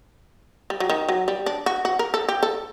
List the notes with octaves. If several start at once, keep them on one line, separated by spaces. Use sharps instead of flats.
G3
F#3
D#3
F#3
G3
D4
F#4
F#4
A#4
A4
G4
A4